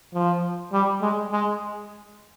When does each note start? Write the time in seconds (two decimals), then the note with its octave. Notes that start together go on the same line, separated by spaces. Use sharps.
0.14 F3
0.72 G3
1.01 G#3
1.32 G#3